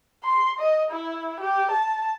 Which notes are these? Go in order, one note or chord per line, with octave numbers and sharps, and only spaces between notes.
C6
D#5
E4
G4
A5